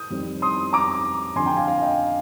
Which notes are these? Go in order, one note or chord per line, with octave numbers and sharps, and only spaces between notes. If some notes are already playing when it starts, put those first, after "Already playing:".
Already playing: D#6 G6
F2 D#3 G3 C4
C6 D#6
A#5 D6
F2 D3 F3 C4 G#5 C6
G5 A#5
F5 G#5
F5 G#5
D#5 G5